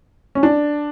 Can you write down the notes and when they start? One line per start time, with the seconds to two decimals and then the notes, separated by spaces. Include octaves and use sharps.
0.35 C#4
0.43 D4